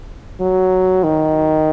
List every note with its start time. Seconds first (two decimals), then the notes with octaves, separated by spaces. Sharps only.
0.41 F#3
1.04 D#3